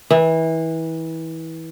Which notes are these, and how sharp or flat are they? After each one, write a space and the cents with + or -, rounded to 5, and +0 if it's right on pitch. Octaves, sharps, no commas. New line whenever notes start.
E3 -25